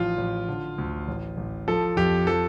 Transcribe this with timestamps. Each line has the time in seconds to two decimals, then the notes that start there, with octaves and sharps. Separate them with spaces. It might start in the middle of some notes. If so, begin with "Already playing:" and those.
Already playing: A1 F3 F4
0.18 A1
0.48 D3
0.78 D2
1.08 A1
1.37 A1
1.68 F3 A4
1.97 F2 G4
2.27 F3 A4